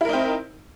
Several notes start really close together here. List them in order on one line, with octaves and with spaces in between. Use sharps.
E4 A#4 D#4 C4